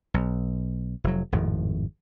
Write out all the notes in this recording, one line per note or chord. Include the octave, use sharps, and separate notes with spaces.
B1
F1 F#3
G#1 F2 A2